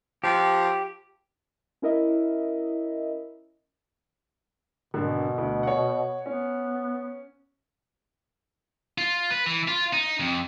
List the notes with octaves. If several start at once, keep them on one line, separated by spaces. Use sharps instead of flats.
F3 G4
C#4 E4 A#4 D#5 E5
G#1 B2 D3
D2
C#5 F#5
B3 C#4
F4
B4
E3
F4
D#4
F2